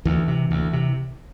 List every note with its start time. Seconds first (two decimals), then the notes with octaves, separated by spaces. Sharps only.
0.05 D2 E3
0.28 C3
0.51 D2
0.73 C3